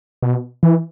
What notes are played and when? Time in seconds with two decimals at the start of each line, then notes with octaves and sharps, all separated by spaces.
0.23 B2
0.63 E3